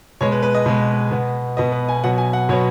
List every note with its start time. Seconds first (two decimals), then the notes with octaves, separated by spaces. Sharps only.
0.21 B2 G#3 B3 C#5
0.32 B4
0.43 B4
0.55 D#5
0.66 B2 G#3 B3
1.11 B2 B3
1.57 B2 B3 D#5
1.72 B4
1.89 G#5
2.04 B2 F#3 B3 F#5
2.18 G#5
2.33 F#5
2.49 B2 F#3 B3 C#5